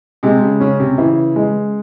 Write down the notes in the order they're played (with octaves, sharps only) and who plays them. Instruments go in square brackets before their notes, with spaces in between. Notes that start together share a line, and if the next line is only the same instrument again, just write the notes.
[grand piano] C3 [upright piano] G#3
[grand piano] C#3
[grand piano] C#3 [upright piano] C#4
[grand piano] C3
[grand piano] C#3 [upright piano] E3
[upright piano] G#3